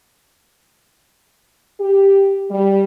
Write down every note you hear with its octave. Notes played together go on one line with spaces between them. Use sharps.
G4
G3